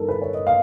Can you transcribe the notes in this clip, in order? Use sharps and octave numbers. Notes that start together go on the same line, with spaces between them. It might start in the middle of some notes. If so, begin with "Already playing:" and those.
Already playing: G2 D#3 A4 A#4
B4
C#5
D#5
F5